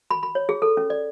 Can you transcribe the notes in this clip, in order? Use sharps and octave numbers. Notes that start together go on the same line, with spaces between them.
B5
B5
C#5
G#4
A4
C#4
D5